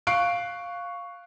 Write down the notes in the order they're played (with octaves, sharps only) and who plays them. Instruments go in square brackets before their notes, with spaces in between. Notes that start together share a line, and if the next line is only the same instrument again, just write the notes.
[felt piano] F5 C#6 F#6 C7 D7